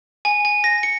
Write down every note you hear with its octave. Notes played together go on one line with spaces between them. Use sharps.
G#5
G#5
A#6
C#7